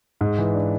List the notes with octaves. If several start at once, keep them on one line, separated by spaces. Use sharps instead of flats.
G#2
E3
D4